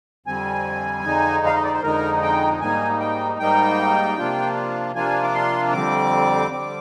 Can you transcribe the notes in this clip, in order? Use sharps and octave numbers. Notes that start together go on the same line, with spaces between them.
F2 D3 G3 C4 G#5
F2 D3 G#3 D#4
F5
D#5
D5
C5
F2 D3 G#3 D#4 A#4
G5
G#2 G3 A#3 D#4 G#5
G5
G#2 G3 A#3 D#4 G5
C3 F3 A#3 D4 F4
C3 F3 A#3 D4 F4 G#5
D6
C6
F2 D3 G3 C4 D6
D3 G3 C4